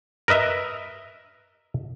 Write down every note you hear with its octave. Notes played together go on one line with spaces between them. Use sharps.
A#4 B4 D#5 E5